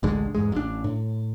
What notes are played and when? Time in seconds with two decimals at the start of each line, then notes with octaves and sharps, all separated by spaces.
0.03 A1 D2 D3 G#3
0.35 E2 G#2 G#3
0.52 A1 D4
0.84 A2